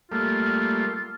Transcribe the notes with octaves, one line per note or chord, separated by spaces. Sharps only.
G3 A3 A#3 F4